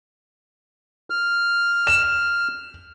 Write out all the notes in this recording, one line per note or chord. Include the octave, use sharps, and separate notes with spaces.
F6
E7